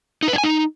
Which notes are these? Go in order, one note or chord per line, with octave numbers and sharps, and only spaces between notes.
D#4
B4
D4
G#5
D#4